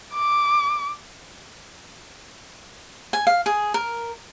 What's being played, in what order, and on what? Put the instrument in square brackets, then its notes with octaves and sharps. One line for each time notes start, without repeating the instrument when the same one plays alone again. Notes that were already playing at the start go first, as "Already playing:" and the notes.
[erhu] D6
[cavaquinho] G#5
F5
G#4
A#4